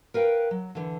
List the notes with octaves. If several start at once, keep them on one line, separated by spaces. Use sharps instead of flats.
A#4 B4 F5 G5
F#3
D3 E3